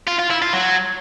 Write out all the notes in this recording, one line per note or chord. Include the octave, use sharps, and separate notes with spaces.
F4
F4
E4
F4
F#3